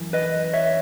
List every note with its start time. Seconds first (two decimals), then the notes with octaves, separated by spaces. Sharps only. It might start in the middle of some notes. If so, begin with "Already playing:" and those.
Already playing: F#2 E3
0.13 B4 D#5
0.53 C#5 E5